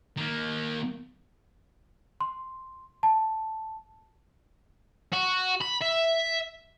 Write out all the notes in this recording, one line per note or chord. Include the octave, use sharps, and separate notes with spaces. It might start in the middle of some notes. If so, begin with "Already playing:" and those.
D#3 A#3
C6
A5
F#4
B5
E5